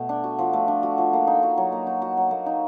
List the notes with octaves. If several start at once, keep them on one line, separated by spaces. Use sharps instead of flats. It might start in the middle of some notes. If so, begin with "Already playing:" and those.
Already playing: B2 A3
D4
F#4
F3
A3
D4
F#4
F3
A#3
D#4
F#4
F#3
A#3
D#4
F#4
F#3
A#3
D#4